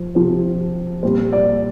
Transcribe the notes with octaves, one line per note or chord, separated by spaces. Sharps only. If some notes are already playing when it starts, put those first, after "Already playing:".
Already playing: F3
C3 F3 C4
A#2 G3 C4 C5
D5